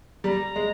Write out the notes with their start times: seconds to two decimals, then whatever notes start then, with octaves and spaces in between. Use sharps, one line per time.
0.24 G3 A#5
0.56 G#3